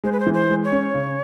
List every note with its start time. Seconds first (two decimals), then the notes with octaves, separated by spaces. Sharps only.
0.04 G#3 C5
0.12 B4
0.20 C5
0.27 E3
0.34 C5
0.50 G#3
0.64 C#5
0.72 C#4
0.94 C#3